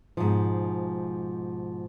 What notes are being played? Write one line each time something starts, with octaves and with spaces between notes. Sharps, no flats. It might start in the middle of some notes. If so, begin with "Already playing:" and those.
G#2 B2 F3